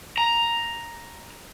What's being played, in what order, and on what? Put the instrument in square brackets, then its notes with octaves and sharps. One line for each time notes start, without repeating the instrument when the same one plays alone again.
[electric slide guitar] A#5